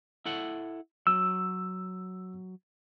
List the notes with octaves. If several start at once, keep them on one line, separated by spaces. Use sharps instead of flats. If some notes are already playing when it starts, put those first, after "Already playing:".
E4 A4 F#5
F#3 E6